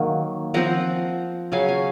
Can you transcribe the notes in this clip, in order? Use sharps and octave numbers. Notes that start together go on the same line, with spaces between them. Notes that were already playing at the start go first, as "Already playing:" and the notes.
Already playing: D#3 F#3 A#3
F3 C4 F#5 A#5
C#3 F#3 C#4 F5 G#5
F5 G#5